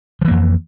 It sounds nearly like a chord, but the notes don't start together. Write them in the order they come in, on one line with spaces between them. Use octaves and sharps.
F3 E3 A#3 F2